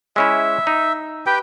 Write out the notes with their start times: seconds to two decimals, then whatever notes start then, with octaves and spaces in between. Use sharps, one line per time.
0.16 G#3 C#4 E4 E5
0.67 D#4
1.26 G4 B4 G5